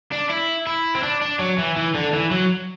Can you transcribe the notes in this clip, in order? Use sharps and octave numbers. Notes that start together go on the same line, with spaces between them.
D4
E4
E4
C4
D4
D4
F#3
E3
E3
D3
E3
F#3